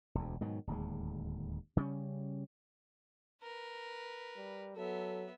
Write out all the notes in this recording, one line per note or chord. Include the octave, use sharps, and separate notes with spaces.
E1 D2
G#2 B2 D#3 F#3
D1 D#2 G#3
C#3 G3 G#3 C#4
A#4 B4
G3
F#3 B3 A4 E5